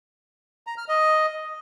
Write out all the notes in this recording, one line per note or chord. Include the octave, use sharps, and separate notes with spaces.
A#5
F6
D#5